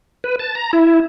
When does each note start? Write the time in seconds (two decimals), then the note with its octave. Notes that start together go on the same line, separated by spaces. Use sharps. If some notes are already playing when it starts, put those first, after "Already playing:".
0.24 B4
0.39 A5
0.55 A#5
0.73 E4